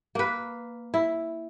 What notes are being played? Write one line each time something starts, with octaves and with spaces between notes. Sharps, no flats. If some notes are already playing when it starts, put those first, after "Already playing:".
A#3 B4
E4